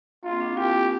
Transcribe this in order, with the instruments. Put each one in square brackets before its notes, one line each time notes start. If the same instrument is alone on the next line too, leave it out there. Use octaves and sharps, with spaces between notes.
[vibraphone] A#3 [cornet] F4
[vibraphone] C4
D4
E4
[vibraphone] F4 [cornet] G4